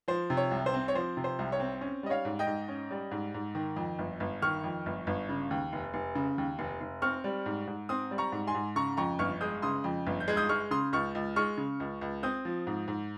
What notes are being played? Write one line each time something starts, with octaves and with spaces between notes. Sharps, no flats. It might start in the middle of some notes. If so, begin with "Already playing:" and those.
F3 C5
C3
C#5
C2
C5
C4
C#5
F3 C5
C3
C5
C2
C#5
C4
C#4
G3 D#5
C#5 F5
G#2
D#5 G5
G#2
C#4
G3
G#2
G#2
D#3
F2
G1
G1
D#3 C#6 F6
F2
G1
G1
C#3
D#2
F1
F1
C#3
D#2
F1
F1
C4 C#6 F6
G3
G#2
G#2
C4 C6 D#6
G3
A#5 C#6
G#2
G#5 C6
G#2
C#3 A#5 C#6
F2 A#5 C#6
G1 C#6 F6
G#3 D#6 G6
C#3 C6 D#6
F2
G1
G6
G#3 G#6
D#6 G6
G#3 C#6 F6
C#3 C6 D#6
C#2 C#6 F6
C#2
G#3 C#6 F6
C#3
C#2
C#2
C4 D#6 G6
F3
G#2
G#2